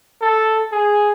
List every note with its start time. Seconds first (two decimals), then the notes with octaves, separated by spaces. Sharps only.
0.21 A4
0.72 G#4